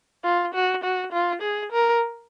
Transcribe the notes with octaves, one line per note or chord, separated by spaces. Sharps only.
F4
F#4
F#4
F4
G#4
A#4